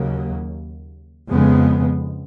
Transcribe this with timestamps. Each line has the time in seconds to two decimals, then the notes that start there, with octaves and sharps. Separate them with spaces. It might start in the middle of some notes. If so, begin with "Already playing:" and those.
Already playing: D#2 C#3 F#3 A#3
1.29 F2 C#3 G#3 B3